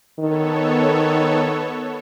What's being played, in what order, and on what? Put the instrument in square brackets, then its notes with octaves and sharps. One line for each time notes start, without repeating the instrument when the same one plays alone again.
[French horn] D#3 [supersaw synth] B3 A4 C#5